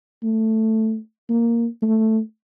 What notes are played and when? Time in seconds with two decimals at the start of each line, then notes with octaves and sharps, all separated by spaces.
0.24 A3
1.29 A#3
1.82 A3